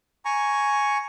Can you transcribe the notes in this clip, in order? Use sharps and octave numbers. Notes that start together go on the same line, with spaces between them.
G#5 A#5 C#6